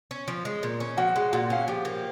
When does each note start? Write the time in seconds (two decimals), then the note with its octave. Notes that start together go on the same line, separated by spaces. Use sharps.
0.11 C#4
0.28 F3
0.45 G#3
0.63 A#2
0.80 C#4
0.97 F3 F#4 F#5
1.16 G#3
1.32 A#2 F#4 F#5
1.50 C#4 F5
1.60 F#5
1.67 F3 G4 G5
1.85 A#3